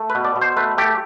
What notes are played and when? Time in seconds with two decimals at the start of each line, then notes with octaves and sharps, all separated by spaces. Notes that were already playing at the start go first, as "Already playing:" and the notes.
Already playing: A3
0.10 B4
0.15 B2
0.25 D5
0.36 B2
0.41 C5
0.57 A3 B4
0.78 A3 G4